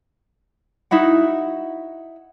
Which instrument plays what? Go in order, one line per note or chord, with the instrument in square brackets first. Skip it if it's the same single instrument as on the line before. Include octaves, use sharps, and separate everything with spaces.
[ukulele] D#4 E4 F#4 F#5